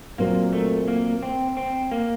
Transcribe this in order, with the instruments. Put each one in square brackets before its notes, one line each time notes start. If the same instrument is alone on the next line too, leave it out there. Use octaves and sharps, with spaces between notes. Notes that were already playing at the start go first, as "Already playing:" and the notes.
[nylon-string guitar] A#2 F#3 C4 F4 A#4 [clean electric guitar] A#3
[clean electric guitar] A3
A#3
C4
C4
A#3